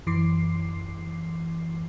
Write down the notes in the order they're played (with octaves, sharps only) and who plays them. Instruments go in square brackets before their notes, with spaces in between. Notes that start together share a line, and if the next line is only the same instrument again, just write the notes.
[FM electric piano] F#2 E3 C6 D6 C7